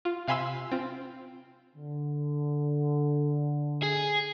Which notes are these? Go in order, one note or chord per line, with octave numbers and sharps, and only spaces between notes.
F4
C3 F5 G#5 B5 C6 E6
C4 F4
D3
G#4